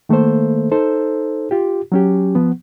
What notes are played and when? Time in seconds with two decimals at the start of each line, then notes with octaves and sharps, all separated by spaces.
0.09 D#3 A3 A#3 A4 C5
0.71 D#4 A4 C5
1.51 F4 G4
1.92 F#3 C#4 G4
2.35 F3 B3